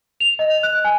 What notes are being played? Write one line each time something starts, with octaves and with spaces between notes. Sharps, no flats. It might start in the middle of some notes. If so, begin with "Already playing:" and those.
F7
D#5
F#6
G#5